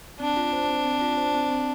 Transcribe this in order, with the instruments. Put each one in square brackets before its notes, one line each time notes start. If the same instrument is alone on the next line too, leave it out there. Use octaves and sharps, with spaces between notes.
[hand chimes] C4 [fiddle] D4
[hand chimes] F4
C5
C4
C4
F4
C5
C4
C4